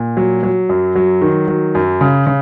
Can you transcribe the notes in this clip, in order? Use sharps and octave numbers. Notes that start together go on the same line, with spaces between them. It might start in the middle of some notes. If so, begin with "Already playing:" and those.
Already playing: A#2
F#3
F#3
F#2
F#3
D#3
F#3
F#2
C#3
C#3